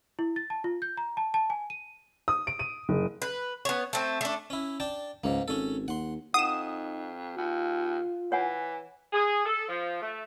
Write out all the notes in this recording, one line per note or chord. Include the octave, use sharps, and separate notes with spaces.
E4
A6
A5
F4
G6
A#5
A5
A5
G#5
D#7
D#6
D7
D#7
F#1
B4
B3 C#5
A3 C4
A3 D4
C#4 E4
D4 G5 A5
C#2 G#2 A#3
G#1 C#4 A4
D#2 F#5 C6
F2 D#4 F#5 D#6 E7
D#2 F4
E3 C#5 F#5 G#5
G#4
A4
F3
A3